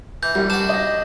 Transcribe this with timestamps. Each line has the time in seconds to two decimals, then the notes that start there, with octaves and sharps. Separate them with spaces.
0.23 E3 G6
0.35 F#2 G3
0.50 D4 F#4 E7
0.69 D#5 A#6